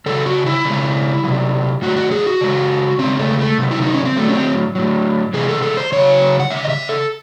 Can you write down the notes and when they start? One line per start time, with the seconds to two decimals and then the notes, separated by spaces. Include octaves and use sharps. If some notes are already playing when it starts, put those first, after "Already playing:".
0.06 C#3 F#3 A4
0.26 F#4
0.46 E4
0.65 C#3 G#3
1.23 C3 F#3
1.82 A2 F#3 F#4
1.96 F#4
2.11 G#4
2.27 F#4
2.41 C#3 G#3
2.99 C#3 G#3 C4
3.19 A3
3.39 A3
3.58 C3 D#3 F#3
3.71 E4
3.82 D#4
3.94 C#4
4.05 C4
4.16 A2 F#3 A3
4.28 C#4
4.35 C4
4.75 A2 F#3
5.33 C3 E3 G#3 G#4
5.49 A4
5.62 A4
5.77 C5
5.92 C#3 F#3 C#5
6.40 F#5
6.50 G#3 E5
6.54 C#3
6.64 D#5
6.69 E5
6.89 A4